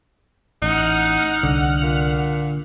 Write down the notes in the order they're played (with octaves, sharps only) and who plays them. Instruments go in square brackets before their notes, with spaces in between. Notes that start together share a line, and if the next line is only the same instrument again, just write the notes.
[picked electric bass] A1 [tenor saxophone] D#4 [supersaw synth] F#5 F6
[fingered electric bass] C2 [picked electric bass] D3
[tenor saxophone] A#2